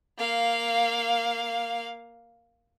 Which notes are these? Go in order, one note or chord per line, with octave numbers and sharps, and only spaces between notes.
A#3 F5